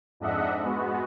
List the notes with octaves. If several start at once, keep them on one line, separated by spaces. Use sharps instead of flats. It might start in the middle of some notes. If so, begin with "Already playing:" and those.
F2 G#2 D4 D#5 E5 F#5
G#3 B3 F#4